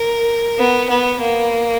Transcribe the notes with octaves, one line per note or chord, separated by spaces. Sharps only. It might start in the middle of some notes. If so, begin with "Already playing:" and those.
Already playing: A#4
B3
B3
A#3